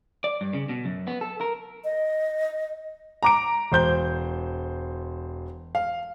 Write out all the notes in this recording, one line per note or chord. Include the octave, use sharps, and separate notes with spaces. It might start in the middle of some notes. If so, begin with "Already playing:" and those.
D5
G2
C#3
B2
F#2
B3
A4
A#4
D#5
A#5 D6 D7
E1 C5 G6 G7
F5